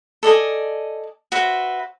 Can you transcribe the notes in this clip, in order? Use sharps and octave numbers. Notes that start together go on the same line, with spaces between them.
A4 D5 D#5 G#5
F#4 B4 C5 E5